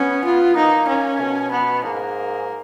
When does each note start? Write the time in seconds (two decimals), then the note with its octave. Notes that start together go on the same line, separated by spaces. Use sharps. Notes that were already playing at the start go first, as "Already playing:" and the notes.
Already playing: B3 C#4
0.25 F4
0.56 A#3 D#4
0.88 C#4
1.21 B2
1.51 B3
1.84 G#2 A#3